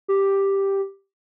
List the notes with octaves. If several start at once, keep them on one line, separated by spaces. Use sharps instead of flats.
G4